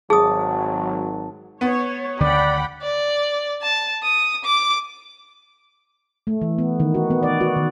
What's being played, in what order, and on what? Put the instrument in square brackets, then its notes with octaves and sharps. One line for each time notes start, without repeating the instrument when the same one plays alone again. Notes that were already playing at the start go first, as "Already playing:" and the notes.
[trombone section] G#1 F#3 [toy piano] G#4 D#6 [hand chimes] A5
[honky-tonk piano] B3 [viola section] C#5
[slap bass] D2 D3 D#3 [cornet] D5 [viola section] F#5 G5 B5
[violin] D5
A5
D#6
D6
[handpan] A3
E3
B3
D#3
F#4
B3
D5
F#4
D#3